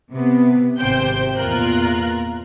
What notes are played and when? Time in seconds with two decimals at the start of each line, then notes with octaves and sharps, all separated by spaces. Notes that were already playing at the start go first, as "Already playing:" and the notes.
0.12 C3 B3
0.79 G#1 C3 C5 G5 G6
1.37 E2 A#2 F4 A#4 F#6